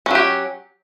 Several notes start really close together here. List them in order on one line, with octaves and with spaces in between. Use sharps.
C#4 F#3 G4